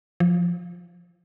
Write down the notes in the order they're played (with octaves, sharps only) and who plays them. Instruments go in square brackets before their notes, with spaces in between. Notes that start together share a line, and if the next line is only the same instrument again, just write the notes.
[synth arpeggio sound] F3